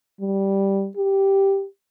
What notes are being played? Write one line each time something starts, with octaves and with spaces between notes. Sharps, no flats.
G3
G4